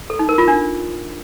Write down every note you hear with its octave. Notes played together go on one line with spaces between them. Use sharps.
A4
D#4
A#4
F4
D4